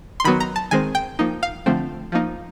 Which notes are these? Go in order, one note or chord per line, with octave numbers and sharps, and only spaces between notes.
C6
D#3 F#3 B3 B5
A#5
A5
D#3 G#3 C4 G#5
G5
F3 A#3 D#4
F5
D3 F3 A3 C4
F3 A#3 D#4